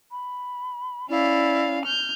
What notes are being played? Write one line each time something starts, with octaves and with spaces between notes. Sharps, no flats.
B5
C#4 E4 D5 F5
F6 G6